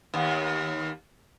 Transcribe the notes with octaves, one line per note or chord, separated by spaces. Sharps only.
D#2 B3